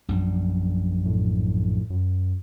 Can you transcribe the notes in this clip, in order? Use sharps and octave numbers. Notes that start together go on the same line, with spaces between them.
A#1 F#2 G3
A2
F#2